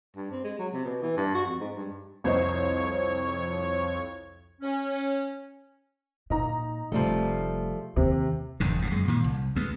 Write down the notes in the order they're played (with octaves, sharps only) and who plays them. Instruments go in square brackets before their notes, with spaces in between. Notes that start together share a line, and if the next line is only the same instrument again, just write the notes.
[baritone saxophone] G2
C4
G#3
F#3
C3
B2
E3
G2
F#4
F2
G#2
G2
[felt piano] C2 C5 D#5 [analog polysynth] F2 C#5 G#6
[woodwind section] C#4
[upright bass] A#2 [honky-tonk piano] D#4 A#5
[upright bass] F1 [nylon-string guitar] F3 G3 A3
[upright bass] D#2 [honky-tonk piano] C3
[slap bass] F1 E2 G#2 D3
G1 A2
F#2 G#3
A#2 D#3 E3
C2
D2 G#3 B3